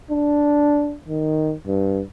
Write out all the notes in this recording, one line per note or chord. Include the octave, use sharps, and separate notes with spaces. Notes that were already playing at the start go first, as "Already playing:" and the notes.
D4
D#3
G2